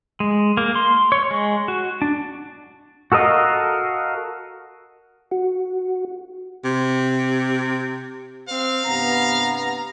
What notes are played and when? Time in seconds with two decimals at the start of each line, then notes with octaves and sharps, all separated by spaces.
0.20 G#3
0.57 A#3
0.76 C6
1.12 C#5
1.31 G#3
1.68 F#4
2.02 D4
3.12 F#4 A4 A#4 D#5 F5
5.31 F#4
6.65 C3
8.49 C4 F5
8.86 G2 C3 B3 A#5